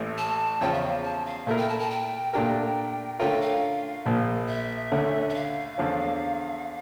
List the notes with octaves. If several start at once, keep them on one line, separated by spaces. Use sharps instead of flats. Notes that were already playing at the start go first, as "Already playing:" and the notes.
Already playing: A1 A2 E3 A3
A5
E2 C#3 F3 C#4 F4 G5
E5
F5
A5
F5
A#2 A3 E4 A#4 E5
G5
A5
A5
G5
A#2 A3 D4 G4 A#4 G5
D3 A3 C#4 F4 A#4 G5
F5
A#1 A#2 F3
E5
D2 D3 A3 C#4
E5
F5
E2 D3 F3 C#4